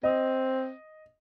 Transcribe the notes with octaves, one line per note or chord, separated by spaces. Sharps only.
C4 D#5